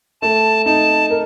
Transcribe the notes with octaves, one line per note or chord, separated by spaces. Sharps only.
A3 A5
D#4 A5
A#4